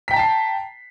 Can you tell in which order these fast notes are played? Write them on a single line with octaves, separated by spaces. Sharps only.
B6 G5 A#5 A5 C7